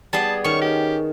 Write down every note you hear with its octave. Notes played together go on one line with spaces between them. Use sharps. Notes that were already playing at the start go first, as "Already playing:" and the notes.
G3 B3 G#4 A5
D#3 C#4 C#6
G4